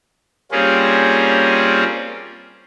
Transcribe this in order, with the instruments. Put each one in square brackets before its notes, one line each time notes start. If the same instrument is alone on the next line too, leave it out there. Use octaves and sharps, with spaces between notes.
[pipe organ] G3 A#3 C4 C#4 F4 G#4